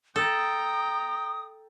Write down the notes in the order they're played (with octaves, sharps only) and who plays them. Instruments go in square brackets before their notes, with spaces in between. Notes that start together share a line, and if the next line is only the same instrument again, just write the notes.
[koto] A4 [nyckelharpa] G5 A#5 [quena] D#6